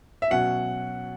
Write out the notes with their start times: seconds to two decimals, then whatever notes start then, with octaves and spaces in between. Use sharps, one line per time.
0.22 E5
0.31 B2 F#3 C#4 F#5